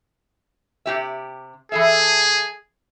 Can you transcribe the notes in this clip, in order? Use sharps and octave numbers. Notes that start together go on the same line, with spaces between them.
C3 G4 E5
E3 G#4 A4 E5